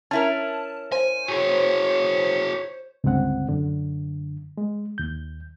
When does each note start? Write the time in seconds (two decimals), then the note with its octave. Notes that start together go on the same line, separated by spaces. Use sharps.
0.11 C#4 E4 A#4 A5
0.92 C5 G#5
1.28 F#4 G#4 C#5
3.04 C#2 G2 D3 C4 F#5
3.49 F#2 D3
4.57 G#3
4.98 D#2 G6